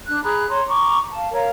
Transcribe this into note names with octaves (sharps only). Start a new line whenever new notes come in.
D4 F#6
G#4 A#5 B5 F#6
C#5 A#5 C6
A#5 C#6 D6
F5 A5
A#4 C#5 F5 A#5